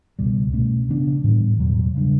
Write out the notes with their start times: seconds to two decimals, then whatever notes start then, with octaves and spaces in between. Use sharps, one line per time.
0.19 C#2 B2 G3
0.53 B2 A3 C#4
0.88 C#3 E3 B3 D4
1.24 A2 E3 G3 B3
1.59 E2 B2 F#3
1.95 C#3 G3 D4